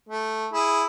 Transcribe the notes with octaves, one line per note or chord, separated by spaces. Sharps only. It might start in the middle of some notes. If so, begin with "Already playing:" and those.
A3
E4 G#4